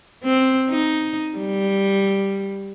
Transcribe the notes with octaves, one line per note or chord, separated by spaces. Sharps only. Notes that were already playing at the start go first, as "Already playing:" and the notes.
C4
D#4
G3